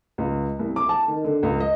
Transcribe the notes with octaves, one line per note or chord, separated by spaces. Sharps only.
C#2
C2
D6
A5
D#3
D3
C#2
D#5